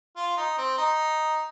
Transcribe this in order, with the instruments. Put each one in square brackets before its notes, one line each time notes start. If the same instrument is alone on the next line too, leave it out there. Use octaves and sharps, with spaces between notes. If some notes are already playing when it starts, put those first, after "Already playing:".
[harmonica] F4
D#4
C4
D#4